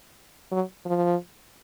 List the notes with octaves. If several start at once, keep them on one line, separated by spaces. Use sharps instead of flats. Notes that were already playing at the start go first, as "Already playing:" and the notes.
F#3
F3